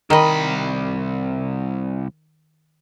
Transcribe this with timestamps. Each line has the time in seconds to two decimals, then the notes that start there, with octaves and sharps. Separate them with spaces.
0.10 C2 D#3 D#5 B5